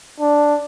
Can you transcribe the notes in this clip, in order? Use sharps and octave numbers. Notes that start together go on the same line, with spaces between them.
D4